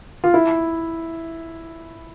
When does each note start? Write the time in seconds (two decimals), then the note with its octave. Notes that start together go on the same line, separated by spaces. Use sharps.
0.24 F4
0.34 E4